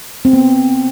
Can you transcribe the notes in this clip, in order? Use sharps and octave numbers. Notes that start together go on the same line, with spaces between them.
C4
B3